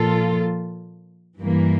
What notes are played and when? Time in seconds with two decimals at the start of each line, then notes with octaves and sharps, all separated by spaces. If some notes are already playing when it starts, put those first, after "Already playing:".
Already playing: A#2 F3 A#3 F4 A4
1.38 G2 E3 A#3